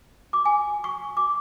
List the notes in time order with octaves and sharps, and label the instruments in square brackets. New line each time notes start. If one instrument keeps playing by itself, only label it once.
[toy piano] D6
G#5
C#6
D6